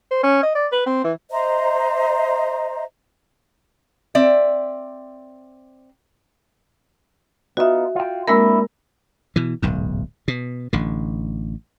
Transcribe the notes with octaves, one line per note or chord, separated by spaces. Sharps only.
C5
C#4
D#5
D5
B4
C4
E3
C5 D#5 E5 A#5
C4 D5 E5
B3 D#4 F4 F#4 E5
F4 G5
G#3 A#3 C4 D4 E4 A#4
B2 E3
D1 B1 G#2
B2
A1 D3